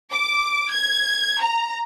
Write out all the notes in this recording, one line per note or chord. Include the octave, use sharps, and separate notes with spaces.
D6
G#6
A#5